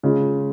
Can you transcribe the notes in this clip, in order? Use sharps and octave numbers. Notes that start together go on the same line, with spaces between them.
C#3 G#3 F4